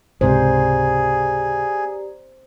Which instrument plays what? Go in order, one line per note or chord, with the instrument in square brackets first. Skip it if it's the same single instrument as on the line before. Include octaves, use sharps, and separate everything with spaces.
[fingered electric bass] C#2 G#2 C3 [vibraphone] G4 D5 A#5 [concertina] G#4 [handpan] C5